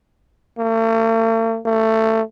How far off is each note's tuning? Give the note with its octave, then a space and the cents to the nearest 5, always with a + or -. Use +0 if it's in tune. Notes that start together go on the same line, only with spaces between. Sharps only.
A3 +45
A3 +20